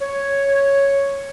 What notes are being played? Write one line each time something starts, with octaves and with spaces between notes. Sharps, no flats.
C#5